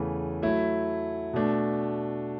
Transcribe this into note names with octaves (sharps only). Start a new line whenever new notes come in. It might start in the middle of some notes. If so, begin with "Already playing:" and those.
Already playing: E2 C#3 E3 A3
F#3 A3 E4
B2 A3 D4